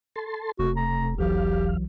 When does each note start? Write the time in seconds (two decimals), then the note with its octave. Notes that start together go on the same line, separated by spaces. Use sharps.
0.16 A4 A5 C6
0.59 E1 C3 A3 F#4
0.77 A#5
1.18 B1 E2 E3 F#3 G4 F5